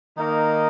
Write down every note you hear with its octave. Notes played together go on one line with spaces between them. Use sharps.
D#3 A#3 D#4